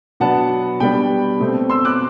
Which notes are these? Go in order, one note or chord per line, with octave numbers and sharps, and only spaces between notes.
B2 F#3 B3 D4 F#5 A5
B2 G3 D4 G5 B5
B2 A3 C4
C6 E6
D6 F#6